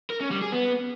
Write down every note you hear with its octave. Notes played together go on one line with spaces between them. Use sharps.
A#4
C#4
G3
G#4
B3